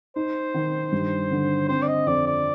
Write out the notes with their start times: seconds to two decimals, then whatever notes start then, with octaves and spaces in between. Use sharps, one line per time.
0.16 D#4 C5
0.54 D#3
0.92 G2
1.31 D3
1.68 C4 C5
1.82 D5
1.88 D#5
2.07 F2 D5
2.26 D5